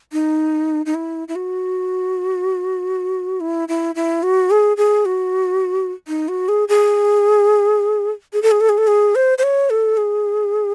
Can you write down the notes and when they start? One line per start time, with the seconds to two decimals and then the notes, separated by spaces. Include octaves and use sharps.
0.12 D#4
0.86 D#4
0.95 E4
1.28 E4
1.35 F#4
3.40 E4
3.68 E4
3.95 E4
4.23 F#4
4.50 G#4
4.77 G#4
5.05 F#4
6.08 D#4
6.28 F#4
6.48 G#4
6.68 G#4
8.33 G#4
8.42 A4
8.51 G#4
8.60 A4
8.69 G#4
8.78 A4
8.87 G#4
9.15 C5
9.38 C5
9.43 C#5
9.70 A4
9.97 G#4